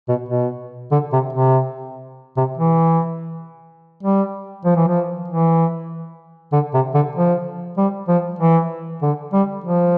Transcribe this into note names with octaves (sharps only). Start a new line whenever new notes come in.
B2
B2
D3
C3
C3
C3
E3
G3
F3
E3
F3
E3
D3
C3
D3
F3
G3
F3
E3
D3
G3
F3